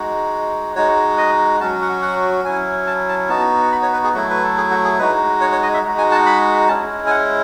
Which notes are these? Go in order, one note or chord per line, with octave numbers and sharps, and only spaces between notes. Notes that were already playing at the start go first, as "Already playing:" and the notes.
Already playing: G#3 D#4 F#4
G#3 D#4 F#4 C#5
D#5
F#3 C#4 F#4 A5
F#5
F#5
F#3 C#4 E4 G#5
A5
A5
B3 D#4 F#4 A5
B5
C#5
B4
G#4
F#3 A3 E4 F#4
B4
A4
G#4
F#4
G#4
G#3 D#4 F#4 B4
C#5
C#5
D#5
E5
G#3 D#4 F#4
G#5
A5
B5
G#3 C#4 E4 A5
G#5
F#5